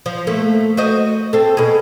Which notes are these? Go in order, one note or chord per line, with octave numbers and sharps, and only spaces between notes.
F3
A3 A#3
F#4 C5 D#5
C4 A4
B2 G#4